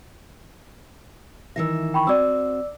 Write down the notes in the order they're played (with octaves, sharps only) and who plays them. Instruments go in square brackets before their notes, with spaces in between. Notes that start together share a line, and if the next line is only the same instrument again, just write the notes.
[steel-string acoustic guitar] D#3 E3 E5 [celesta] E6 A#6
[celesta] G5 B5 C#6
[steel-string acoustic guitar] C4 F#4 [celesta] D5 D6 E6